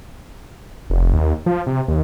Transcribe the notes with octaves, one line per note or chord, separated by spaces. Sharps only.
F1
D#2
F3
C3
D#2